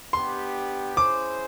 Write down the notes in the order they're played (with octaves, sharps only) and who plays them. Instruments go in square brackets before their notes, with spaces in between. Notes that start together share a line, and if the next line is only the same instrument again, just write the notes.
[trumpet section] B3 D4 G4 [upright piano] C6
[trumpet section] C#4 E4 G#4 C5 [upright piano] D6